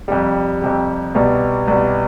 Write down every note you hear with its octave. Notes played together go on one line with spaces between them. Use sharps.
F2 C3 G3
F2 C3 G3
C2 B2 G3
C2 B2 G3